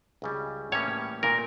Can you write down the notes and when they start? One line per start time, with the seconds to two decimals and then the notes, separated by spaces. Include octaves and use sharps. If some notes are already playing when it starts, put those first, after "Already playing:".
0.22 C#2 C#3 G3 C#4
0.72 A2 E3 G3 A#3 C#4 C#5
1.23 A#2 A3 A#4